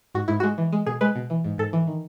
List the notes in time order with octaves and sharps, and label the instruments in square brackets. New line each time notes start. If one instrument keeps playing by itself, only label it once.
[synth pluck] G#2 F#4
G#2 E4
G#3 F#4
E3
G#3
B2 G#4
G#3 B4
B2
E3
G#2
G#2 A4
E3
D#3